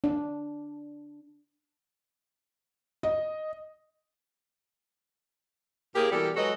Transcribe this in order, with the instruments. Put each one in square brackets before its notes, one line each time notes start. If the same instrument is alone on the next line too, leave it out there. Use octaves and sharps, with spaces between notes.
[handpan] D4
[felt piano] D#5
[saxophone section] A2 A#3 G4 G#4 A#4
B2 E3 G3 G4 A4 A#4
F#3 G#3 F#4 A4 B4 D#5